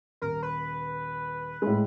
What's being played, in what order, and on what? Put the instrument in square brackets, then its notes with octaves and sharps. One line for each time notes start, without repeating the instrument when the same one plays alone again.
[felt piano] D#1 [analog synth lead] A#4
[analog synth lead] B4
[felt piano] A2 G#3